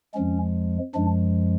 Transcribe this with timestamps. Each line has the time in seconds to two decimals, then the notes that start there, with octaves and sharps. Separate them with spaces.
0.14 F2 F3 G#3 C#4
0.94 F#2 F3 G#3 D4